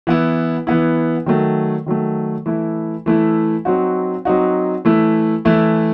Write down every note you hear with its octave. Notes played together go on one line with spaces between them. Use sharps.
E3 B3 E4
E3 B3 E4
D#3 F#3 A3
D#3 F#3 A3
E3 A3 E4
E3 A3 E4
F#3 C4 D#4 F#4
F#3 C4 D#4 F#4
E3 A3 E4
E3 A3 E4